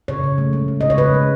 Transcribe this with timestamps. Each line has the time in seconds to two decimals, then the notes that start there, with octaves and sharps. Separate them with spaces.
0.08 C#3 C#5
0.24 C#3
0.38 A3
0.53 G#3
0.68 G#3
0.81 C#3 D#5
0.90 C#5
0.98 C#3 B4
1.14 G#3